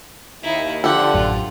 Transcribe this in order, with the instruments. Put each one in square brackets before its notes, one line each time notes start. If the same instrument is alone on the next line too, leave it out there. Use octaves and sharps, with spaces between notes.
[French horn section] D#2 [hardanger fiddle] D#4 E4
[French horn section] D3 [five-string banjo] F3 G4 A4 [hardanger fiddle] F#5
[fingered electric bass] A1 F#2 [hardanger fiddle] F4